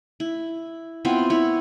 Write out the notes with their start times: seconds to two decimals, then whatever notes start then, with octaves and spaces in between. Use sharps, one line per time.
0.20 E4
1.05 B3 C4 E4 F4
1.30 E4 C#5